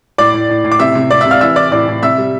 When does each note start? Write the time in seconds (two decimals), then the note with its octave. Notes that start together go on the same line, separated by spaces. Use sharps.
0.18 A2 D5 D6
0.34 A2
0.49 A2
0.64 A2
0.72 D6
0.79 C3 E5 E6
0.95 C3
1.10 C3 D5 D6
1.21 E5 E6
1.25 C3
1.31 F5 F6
1.41 E3 E5 E6
1.56 E3 D5 D6
1.72 A2 D5 D6
1.88 A2
2.03 C3 E5 E6
2.18 G3